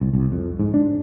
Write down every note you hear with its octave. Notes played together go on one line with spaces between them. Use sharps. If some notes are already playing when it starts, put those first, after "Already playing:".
C2
C2
F2
G#2
D4